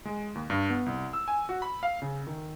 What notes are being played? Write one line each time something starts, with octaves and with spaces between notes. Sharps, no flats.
G#3
D#2
G2
B3
C2
E6
G#5
F#4
B5
F5
C#3
D#3